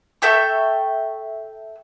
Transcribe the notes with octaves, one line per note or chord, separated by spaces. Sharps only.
A4 E5 G5 C#6